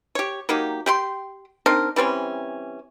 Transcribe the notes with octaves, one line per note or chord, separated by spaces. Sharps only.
G4 C#5
F#3 A#3 D#4 G4
G4 G5 C6
C4 D4 D#4 A#4
E3 G3 C4 C#4